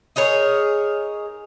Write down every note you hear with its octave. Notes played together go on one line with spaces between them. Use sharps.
D#4 G#4 A#4 C#5